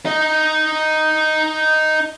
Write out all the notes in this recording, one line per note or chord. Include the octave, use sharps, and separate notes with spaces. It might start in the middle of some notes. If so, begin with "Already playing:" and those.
D#4 D#5